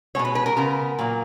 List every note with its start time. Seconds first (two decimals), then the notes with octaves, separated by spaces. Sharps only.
0.15 B2 G#3 B3 C#5
0.25 B4
0.35 B4
0.46 A#4
0.56 C#3 G#3 B3 A#4
0.99 A#2 F#3 A#3